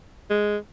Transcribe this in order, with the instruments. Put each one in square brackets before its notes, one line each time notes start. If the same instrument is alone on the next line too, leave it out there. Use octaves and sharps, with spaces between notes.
[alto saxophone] G#3